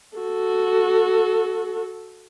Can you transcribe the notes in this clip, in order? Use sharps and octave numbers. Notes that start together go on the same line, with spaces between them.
F#4 A4